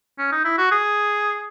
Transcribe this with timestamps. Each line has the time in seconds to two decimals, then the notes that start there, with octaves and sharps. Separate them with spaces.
0.19 C#4
0.32 D#4
0.45 E4
0.58 F#4
0.72 G#4